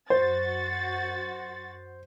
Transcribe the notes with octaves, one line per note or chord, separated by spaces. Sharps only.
F#2 F#4 C5 A6